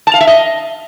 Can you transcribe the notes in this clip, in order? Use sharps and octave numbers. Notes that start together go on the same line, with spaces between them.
A5
F5
E5
D#5